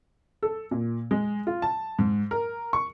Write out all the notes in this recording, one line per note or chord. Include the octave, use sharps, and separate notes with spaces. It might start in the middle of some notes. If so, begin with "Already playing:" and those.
A4
A#2
G#3
F4
A5
G#2
A#4
C#6